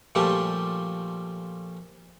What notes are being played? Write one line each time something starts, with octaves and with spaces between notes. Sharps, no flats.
A#2 F3 G3 A3 G4